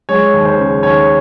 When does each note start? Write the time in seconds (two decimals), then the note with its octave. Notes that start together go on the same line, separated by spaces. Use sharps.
0.09 G#3 C#5
0.33 D#2
0.45 C5
0.58 C#3
0.82 D#2 C#5